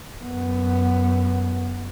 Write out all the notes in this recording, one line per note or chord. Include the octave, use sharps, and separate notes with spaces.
F#2 B3